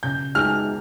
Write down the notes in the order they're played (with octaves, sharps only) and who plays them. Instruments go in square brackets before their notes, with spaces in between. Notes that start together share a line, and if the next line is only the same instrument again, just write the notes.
[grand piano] C#3 [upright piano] G6
[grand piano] G#3 D#4 [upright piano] F6